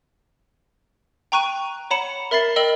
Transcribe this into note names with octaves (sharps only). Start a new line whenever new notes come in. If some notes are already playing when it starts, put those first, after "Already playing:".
G5 A#5 C#6 F#6 D#7
C#5 F#5 A#5 B5 C#7 E7
A#4 E5 B5 A6 C7
A#4 D#5 G5 E6 F#7